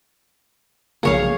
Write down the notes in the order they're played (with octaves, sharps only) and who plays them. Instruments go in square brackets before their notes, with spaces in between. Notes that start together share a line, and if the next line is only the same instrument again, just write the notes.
[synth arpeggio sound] B1 C#3 A#3 [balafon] F3 G#3 [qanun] G#4 C#5 F5